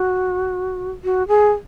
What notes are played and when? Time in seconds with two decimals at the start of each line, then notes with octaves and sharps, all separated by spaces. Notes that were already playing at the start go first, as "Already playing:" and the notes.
Already playing: F#4
1.04 F#4
1.28 G#4